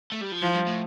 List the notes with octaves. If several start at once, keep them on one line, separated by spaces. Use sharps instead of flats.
A3
G3
F3
E3 F3
G2
A2